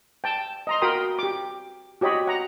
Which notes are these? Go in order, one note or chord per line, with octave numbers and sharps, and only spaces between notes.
G5 A5
D#5 A#5 C6
F#4 A#4 G5 B5 C6 D#6
G4 D6
F#4 G4 C#5 D#5 B5
F#5 A#5